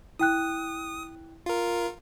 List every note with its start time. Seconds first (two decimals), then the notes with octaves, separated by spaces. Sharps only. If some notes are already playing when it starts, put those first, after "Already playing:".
0.19 E4 G5 D#6 F#6
1.46 F4 A#4